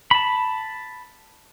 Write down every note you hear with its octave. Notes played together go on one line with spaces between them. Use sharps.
A5 B5